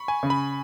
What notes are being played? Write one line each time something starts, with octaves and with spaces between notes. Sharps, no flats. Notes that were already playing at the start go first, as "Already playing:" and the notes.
Already playing: B5 C#6
G#5
C#3
B5